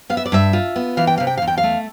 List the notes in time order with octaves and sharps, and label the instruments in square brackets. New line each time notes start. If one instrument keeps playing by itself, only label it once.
[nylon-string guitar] B3 F5
E5
D5
G2 E5
F4
B3
E3 F5
G5
C3 F5
G5
E2 F5
G5
F5
A3